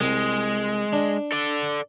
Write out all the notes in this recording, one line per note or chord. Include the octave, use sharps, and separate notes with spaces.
C2 G#3
D4
A4 D5